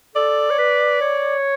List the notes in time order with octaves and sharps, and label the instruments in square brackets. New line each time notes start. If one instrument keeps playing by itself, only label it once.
[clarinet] A4 [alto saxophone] D5
[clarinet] C#5
B4
C#5